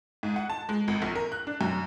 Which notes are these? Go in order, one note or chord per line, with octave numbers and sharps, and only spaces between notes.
G#2
F#5
A5
G#3
G#1
A#1
A#4
F#6
D4
F#2